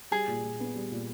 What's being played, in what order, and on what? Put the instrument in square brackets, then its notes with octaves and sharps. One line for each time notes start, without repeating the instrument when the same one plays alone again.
[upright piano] G3 [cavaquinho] G#4
[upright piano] A#2
A#2
B3
G3
A#2